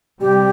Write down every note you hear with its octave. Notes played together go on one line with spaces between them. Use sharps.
C3 G3 G4